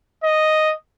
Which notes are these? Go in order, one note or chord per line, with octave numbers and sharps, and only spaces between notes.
D#5